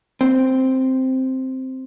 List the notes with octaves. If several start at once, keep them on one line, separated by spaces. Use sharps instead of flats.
C4